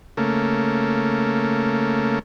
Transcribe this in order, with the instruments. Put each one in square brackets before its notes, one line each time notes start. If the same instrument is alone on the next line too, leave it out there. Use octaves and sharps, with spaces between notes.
[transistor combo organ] C#3 A3 A#3